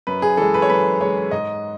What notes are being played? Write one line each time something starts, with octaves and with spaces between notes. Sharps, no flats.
F#2 B4
G#4
E3 G#3 A4
B4
C#5
F#2 B4
E3 G#3 C#5
G#2 D#5